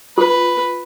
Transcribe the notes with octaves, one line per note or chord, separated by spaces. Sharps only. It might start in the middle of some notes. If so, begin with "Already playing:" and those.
F4 B4